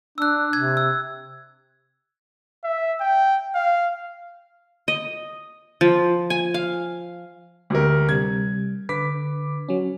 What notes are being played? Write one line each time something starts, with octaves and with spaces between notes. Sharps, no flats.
D4 E6 F#6
C3 G#6
E6
E5
G5
F5
D#5
F3
G#5
F5
D2 G4 A#4
C3 G3 G#6
D3 B4 D6 B6
F#3 C#4